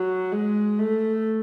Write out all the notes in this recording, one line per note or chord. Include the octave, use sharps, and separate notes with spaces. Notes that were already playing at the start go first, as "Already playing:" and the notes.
Already playing: F#3
G#3
A3